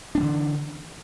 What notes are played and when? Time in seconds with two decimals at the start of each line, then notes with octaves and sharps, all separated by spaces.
0.15 D4
0.17 B3
0.20 E3
0.23 D3